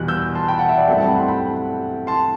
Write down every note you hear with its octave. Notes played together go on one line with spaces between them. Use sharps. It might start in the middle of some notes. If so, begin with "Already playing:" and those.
Already playing: E2 B2 G3 F#6
E6 G6
A5 C6
G5 B5
F#5 A5
E5 G5
D5 F#5
G2 F#3 A3 C4 E4 E5 G5
F#5 A5
G5 B5
A5 C6
G5 B5
A5 C6